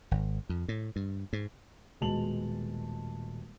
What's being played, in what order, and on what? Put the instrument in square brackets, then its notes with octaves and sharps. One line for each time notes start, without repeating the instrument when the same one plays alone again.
[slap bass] G#1
F2
A2
G2
G#2
[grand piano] D#1 B2 G#3 A5 F7 F#7